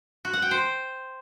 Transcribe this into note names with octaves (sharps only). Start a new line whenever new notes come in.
F#4
F#5
G5
C5